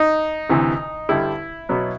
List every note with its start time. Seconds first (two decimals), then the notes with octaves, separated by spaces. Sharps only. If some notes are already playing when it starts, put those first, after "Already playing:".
Already playing: D#4
0.49 D2 C3 E3
1.09 G2 D3 G3 E4
1.69 B2 F#3 B3